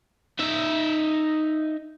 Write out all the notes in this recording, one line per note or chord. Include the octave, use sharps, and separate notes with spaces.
D#4 E5